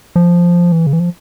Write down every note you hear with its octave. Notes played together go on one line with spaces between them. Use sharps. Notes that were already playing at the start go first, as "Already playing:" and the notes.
F3
E3
C#3
E3
F3